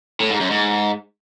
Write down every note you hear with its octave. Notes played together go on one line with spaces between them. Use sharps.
A2
G#2
F#2
G#2